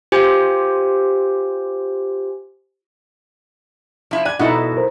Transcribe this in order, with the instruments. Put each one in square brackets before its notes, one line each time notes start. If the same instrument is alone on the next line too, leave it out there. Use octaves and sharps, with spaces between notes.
[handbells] F4 G4 C5 G#5
[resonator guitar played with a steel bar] F3 E4
[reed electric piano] D5 F#6 [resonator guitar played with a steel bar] G#5
[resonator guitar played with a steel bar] B2 A4 [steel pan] D#4 E4 F#5
[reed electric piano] A#4 C5